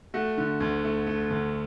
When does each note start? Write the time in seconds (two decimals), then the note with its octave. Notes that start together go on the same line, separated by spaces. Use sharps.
0.14 A3 F#4
0.37 D3
0.60 D2
0.84 A3
1.07 A3
1.31 D2